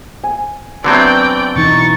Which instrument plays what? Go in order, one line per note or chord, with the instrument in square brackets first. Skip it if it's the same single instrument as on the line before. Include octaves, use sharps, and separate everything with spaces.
[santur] G#5
[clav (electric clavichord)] D3 F#3 C4 [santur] B3 E5 [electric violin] D5 G5
[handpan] B2 E3 D#4 [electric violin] C#6 A6